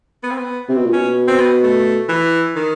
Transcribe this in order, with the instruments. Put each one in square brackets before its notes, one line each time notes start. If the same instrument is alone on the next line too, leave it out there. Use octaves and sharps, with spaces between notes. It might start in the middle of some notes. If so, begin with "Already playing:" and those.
[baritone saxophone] B3
C4
B3
[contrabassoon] C3 [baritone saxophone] C4
[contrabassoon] B2
A#2
[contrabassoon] B2 [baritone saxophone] C#4
[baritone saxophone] C4
B3
A3
E3
D#3